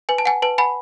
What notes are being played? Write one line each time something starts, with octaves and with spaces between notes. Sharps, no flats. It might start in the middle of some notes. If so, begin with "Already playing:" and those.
B4 G#5
A5
F#5 G#5
B4 A5
F#5 G#5 B5